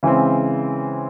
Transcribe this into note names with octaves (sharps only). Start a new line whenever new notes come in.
C#3 E3 G#3 C4